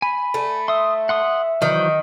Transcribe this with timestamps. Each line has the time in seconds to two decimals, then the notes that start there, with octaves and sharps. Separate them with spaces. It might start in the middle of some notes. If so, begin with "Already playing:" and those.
0.02 G#5 B5
0.34 A3
0.68 E5 C6 D#6
1.09 F#5 C6 D#6
1.62 D#3 E3 F#3 C5